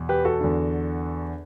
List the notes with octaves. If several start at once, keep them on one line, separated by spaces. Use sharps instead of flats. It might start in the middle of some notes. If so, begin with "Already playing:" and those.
Already playing: E2 B2
G4 B4
F#4 A4
E2 D3